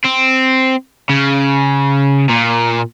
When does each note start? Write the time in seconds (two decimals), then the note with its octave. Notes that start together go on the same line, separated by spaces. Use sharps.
0.04 C4
1.09 C#3
2.29 A#2